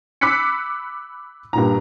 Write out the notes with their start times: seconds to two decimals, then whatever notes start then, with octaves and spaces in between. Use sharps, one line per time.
0.21 B5 D6 E6 F#6 B6 C#7
1.53 G2 A#2 A#5